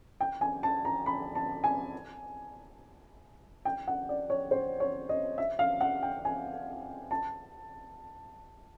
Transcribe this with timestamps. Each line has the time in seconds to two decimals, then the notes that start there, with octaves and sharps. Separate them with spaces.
0.21 G5
0.41 G#5
0.63 A5
0.85 A#5
1.06 B5
1.35 A5
1.64 G#5
3.65 G5
3.88 F#5
4.09 D5
4.30 C#5
4.51 C5
4.80 C#5
5.09 D#5
5.38 E5
5.59 F5
5.81 F#5
6.03 G5
6.25 G#5
7.11 A5